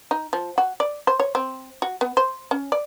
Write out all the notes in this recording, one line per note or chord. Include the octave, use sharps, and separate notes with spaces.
D#4
F3
F#4
D5
C5
C#5
C4
F#4
B3
C5
C#4
D5